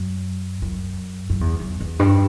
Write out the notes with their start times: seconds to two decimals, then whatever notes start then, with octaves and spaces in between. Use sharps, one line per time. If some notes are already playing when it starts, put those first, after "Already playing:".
Already playing: F#2
0.62 F#2
1.30 F#2
1.41 E2
1.60 F#2
1.81 E2
1.99 G2